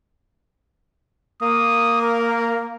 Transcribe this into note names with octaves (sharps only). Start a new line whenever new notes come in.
A#3 D#6
A#4